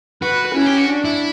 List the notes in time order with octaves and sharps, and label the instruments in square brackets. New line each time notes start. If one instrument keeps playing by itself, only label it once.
[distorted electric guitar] F#4 [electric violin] B4
[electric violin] C#4 [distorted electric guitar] E4
[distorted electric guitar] G4
F#4
[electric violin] D4
[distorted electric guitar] E4